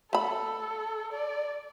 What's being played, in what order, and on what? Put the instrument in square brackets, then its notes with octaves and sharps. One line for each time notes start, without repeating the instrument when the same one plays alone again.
[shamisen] A3 B5 [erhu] A4
[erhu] D5